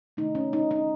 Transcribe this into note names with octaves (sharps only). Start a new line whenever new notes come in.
C3 D#3 A3 D#4
C#4
D#4
D#4